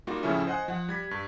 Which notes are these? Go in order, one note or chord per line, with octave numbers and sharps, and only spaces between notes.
G3 A#3 D#4 F4 F#4
A2 C#3 F3 A3 C#4 E4
C5 D#5 F#5 G#5 F#6
F3 F#5
G3 G#6 B6
G2